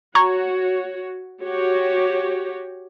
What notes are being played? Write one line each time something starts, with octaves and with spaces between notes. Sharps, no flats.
F#4 C#5 A#5 C#6 G#6
F#4 G4 C#5